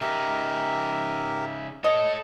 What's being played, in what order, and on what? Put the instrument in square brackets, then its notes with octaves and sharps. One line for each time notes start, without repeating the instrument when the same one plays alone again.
[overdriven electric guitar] C#3 D#4 [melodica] G4 A#4 [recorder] E5
[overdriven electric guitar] A4 C#5 [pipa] D#5